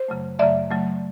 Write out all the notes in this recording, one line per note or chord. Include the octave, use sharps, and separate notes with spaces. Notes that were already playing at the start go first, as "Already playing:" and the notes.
Already playing: C5
F#2 C#3 F#3 A3
F#2 C#3 F#3 A3 D5 E5
F#2 C#3 F#3 A3